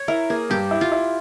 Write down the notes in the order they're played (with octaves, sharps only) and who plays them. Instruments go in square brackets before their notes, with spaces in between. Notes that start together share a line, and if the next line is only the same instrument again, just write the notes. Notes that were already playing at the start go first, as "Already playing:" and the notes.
Already playing: [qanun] C#5
[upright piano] E4 [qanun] A#4
[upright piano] A#3 [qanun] G#4
[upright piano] G2 [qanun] G4
[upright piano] E4
[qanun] F4
[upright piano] E4